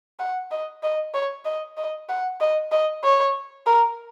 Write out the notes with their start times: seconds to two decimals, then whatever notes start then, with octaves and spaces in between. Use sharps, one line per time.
0.19 F#5
0.51 D#5
0.83 D#5
1.14 C#5
1.45 D#5
1.77 D#5
2.09 F#5
2.41 D#5
2.72 D#5
3.04 C#5
3.67 A#4